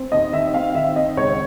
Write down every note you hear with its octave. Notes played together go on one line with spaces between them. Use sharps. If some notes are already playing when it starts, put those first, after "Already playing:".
Already playing: C4
D#2 D#5
D#3 E5
C4 F5
D#3 E5
C4 D#5
C#2 C#5